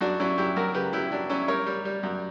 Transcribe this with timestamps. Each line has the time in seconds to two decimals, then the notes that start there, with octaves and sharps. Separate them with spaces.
0.01 F#2 D4 F#4
0.20 F#3 C#4 E4
0.38 F#2 E4 G4
0.56 F#2 F#4 A#4
0.74 C#3 G4 B4
0.93 F#3 E4 G4
1.12 F#3 D4
1.29 F#3 C#4 E4
1.48 G3 A#4 C#5
1.66 G3
1.85 G3
2.03 F#2